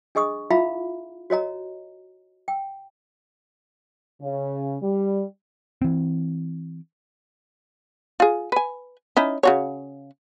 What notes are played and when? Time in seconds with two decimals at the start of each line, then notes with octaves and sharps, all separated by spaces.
0.15 D4 G#4 D#5 C#6 D#6
0.50 E4 F4 E5 F5 A#5 B5
1.30 F#4 C#5 D#5 A#5
2.48 G5
4.21 C#3
4.81 G3
5.82 E3 C4
8.20 F4 G#4
8.52 B4 G#5
9.17 C#4 D#4 E4
9.43 C#3 F#4 C#5